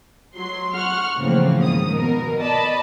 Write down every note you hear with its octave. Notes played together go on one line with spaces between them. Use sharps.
F#3 C6
F#5 C#6 F6
A2 C#3 E3 F3 A#3 C4
G#2 D#3 D#6
B2 A#4
D5 D#5 A5 B5